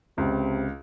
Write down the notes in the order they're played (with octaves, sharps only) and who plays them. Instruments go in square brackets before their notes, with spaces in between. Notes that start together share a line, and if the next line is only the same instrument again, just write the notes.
[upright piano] C#2 [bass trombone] C3